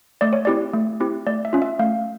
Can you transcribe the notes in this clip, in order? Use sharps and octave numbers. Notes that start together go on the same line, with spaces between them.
A3 D5
C#5
C4 E4 G4 D5
A3
C4 E4 G4
A3 D5
E5
C#4 F4
E5
A3 F5